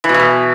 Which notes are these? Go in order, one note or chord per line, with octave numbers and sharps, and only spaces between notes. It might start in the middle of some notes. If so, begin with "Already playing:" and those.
E3
B2
E3
B2